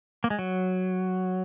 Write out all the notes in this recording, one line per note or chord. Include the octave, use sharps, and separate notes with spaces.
A#3
G#3
F#3